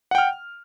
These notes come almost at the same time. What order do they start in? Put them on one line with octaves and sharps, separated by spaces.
F#5 G5 F6